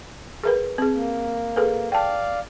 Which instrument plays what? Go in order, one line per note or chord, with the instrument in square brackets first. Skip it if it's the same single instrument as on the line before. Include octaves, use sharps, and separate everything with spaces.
[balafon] G#4 A#4 B4
C4 G#4
[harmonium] A#3
[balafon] G#4 A4 B4
[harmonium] D5 F5 [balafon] G5 A5